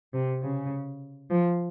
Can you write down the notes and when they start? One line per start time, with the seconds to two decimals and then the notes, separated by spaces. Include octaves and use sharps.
0.14 C3
0.43 C#3
1.30 F3